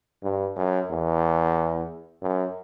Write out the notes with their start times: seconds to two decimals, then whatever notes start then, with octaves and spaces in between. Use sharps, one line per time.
0.23 G2
0.56 F#2
0.90 E2
2.22 F#2